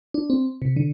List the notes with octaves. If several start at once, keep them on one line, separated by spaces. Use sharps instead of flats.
D4
C4
C3
D3